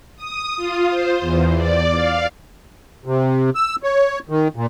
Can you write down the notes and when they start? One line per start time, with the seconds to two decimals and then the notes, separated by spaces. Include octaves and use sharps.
0.16 D#6
0.56 F4
0.90 C5
1.20 E2
1.55 D5
1.95 F5
3.05 C3
3.55 E6
3.83 C#5
4.29 D#3
4.56 A#2